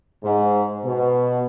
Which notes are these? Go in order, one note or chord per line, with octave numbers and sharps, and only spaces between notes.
G#2
B2